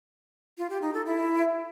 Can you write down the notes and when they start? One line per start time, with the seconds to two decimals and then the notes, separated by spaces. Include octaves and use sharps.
0.58 F4
0.70 G4
0.82 D#4
0.94 A4
1.06 E4